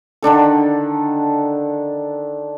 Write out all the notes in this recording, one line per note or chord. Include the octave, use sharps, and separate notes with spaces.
D3 D#3 D4 A4